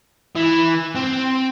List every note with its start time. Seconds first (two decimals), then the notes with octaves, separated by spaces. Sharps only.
0.36 E3
0.95 C4